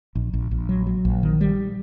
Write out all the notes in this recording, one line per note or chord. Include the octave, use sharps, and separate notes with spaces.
A#1
A#1
A#1
F#3
F#3
A#1
D#3
G3